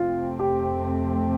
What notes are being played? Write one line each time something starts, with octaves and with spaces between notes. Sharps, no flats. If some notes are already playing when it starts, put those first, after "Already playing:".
Already playing: F2 C3 A3 C4 F4
G4